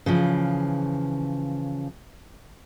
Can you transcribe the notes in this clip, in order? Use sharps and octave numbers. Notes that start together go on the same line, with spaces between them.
C#3 E3 F3